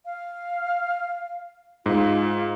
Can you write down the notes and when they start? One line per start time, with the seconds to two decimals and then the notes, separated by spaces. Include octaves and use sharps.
0.06 F5
1.86 G#2 F4